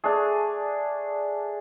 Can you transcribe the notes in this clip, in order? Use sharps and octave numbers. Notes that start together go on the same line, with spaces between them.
A3 D4 G#4